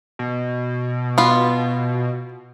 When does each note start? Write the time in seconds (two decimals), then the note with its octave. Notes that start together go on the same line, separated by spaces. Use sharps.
0.19 B2
1.18 B3 F4